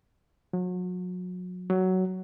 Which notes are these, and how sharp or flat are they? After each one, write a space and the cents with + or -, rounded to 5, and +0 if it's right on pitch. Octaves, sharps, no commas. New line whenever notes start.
F#3 -35
F#3 +10